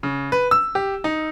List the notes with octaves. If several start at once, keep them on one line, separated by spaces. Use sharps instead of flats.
C#3
B4
E6
G4
D#4